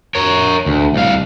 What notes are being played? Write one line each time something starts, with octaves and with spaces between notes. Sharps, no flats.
A#4 C#5
D2
C2 F5